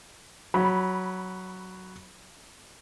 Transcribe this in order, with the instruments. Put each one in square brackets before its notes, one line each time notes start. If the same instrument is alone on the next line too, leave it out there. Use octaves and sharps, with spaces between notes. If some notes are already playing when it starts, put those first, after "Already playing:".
[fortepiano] F#3 [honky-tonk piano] B5